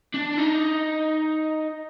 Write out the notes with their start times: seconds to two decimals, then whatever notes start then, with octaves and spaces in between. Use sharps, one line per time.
0.14 D4
0.38 D#4